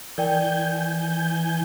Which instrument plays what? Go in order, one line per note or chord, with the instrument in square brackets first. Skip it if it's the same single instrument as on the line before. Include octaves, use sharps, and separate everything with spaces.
[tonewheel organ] E3 G#5 G6 [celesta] A#4 D5 G5